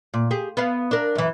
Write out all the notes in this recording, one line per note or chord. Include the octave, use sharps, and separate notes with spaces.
A#2
G4 G#4
B3 F5
D4 A#4
F#2 E3